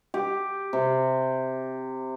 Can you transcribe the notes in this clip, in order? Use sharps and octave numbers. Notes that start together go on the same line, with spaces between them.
G4
C3